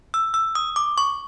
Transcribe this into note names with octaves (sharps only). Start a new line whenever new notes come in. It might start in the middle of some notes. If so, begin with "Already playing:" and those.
E6
E6
D#6
D6
C#6